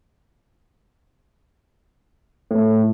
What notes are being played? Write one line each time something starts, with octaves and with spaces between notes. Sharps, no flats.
A2